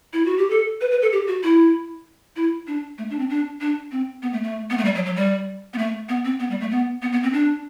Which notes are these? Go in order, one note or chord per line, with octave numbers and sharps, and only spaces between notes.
E4
F#4
G4
A4
B4
B4
A4
G4
F#4
E4
E4
D4
A3
D4
C4
D4
D4
C4
B3
A3
A3
B3
A3
G3
F#3
F#3
G3
B3
A3
B3
C4
B3
G3
A3
B3
B3
B3
C4
D4